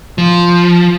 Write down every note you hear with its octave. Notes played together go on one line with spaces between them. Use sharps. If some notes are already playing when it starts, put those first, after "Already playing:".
F3